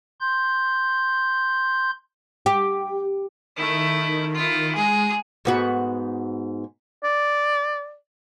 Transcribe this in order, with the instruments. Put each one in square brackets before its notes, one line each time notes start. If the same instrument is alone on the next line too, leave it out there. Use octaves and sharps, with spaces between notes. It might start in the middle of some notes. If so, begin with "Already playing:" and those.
[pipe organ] C6 G6
[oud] G4
[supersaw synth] D#3 [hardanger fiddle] A3 E4
[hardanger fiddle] E4 F4
[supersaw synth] G#3 [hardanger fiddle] G#4
[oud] G#2 B3 F#4
[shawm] D5